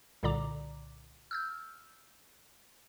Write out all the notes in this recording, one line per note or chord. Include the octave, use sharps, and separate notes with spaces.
C2 A#2 D3 D5 A#5 D6
E6 F6 G6